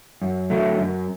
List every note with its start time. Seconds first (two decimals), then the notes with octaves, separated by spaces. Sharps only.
0.22 F#2
0.50 D3 F#3 A3
0.78 F#2